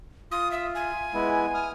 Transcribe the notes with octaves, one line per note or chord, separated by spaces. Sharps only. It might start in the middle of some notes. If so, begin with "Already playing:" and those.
F4 D#6
E5
G#5
G#3 B3 E4
D#6 F6